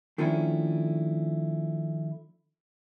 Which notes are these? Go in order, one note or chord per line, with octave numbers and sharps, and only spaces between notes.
D#3 F3 A3 C#4 D4 E4